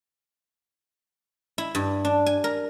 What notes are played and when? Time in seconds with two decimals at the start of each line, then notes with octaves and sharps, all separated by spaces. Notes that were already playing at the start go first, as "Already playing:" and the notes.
1.58 E4
1.75 G2
2.05 D4
2.26 G#5
2.44 A#4